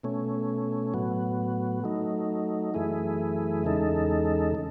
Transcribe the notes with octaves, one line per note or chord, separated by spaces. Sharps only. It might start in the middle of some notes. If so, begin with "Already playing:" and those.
B2 A3 C#4
A2 F#3 B3
F#3 A3 D#4
F#2 E3 A3 E4 G#4
E2 C#3 G#3 D#4 A4
C#3